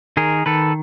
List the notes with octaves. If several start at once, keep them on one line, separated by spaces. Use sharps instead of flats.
D#3 G#4 A#4
D#3 A4 B4